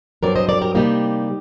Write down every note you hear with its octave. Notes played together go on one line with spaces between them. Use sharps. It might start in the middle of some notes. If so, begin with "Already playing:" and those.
G2 F#3 C4 A#4 D5
C5 D#5
A#4 D5
G4 A#4
C3 G3 A#3 D#4 G4